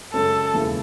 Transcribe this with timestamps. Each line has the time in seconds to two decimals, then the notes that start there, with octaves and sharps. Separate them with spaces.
0.13 F#2 C#3 G#3 A4
0.53 E1 D#2 C#3 E3